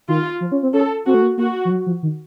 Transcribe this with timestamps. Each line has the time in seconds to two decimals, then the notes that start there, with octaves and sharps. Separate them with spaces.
0.08 D#3 F4
0.41 F3
0.52 C#4
0.63 C4
0.73 C#4 A4
1.06 C4 F#4
1.14 A3
1.22 A#3
1.38 A#3 F#4
1.65 F3
1.70 F#3
1.86 F3
2.03 D#3